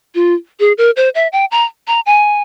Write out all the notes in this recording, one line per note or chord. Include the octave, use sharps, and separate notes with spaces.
F4
G#4
A#4
C5
E5
G5
A#5
A#5
G#5